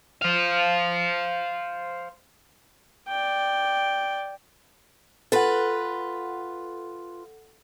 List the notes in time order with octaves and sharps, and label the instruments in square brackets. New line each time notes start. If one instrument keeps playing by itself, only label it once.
[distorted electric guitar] C5 F5
[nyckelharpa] D5 G5
[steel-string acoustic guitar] F4 B4 [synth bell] A4 F#5